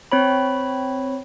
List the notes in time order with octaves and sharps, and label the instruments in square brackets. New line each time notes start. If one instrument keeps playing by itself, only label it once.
[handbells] C4 C#5 B5